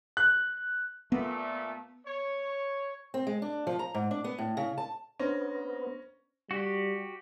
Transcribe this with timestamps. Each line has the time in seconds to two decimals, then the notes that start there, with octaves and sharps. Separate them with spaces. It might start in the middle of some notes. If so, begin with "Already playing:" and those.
0.17 F#6
1.12 A#2 A3 B3
2.06 C#5
3.14 C4
3.27 G#3
3.42 D4
3.67 F3
3.79 A#5
3.94 G#2
4.11 D4
4.24 B3
4.38 A2
4.57 C#3
4.78 A5
5.20 B3 C#4 D4 C5 A#6
6.51 G3 F#4 G4